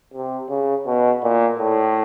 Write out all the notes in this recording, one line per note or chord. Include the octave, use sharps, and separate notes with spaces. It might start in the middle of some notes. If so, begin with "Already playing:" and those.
C3
C#3
B2
A#2
A2